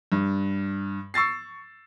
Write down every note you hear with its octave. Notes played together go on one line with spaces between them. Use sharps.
G2
C#6 E6 A6 C7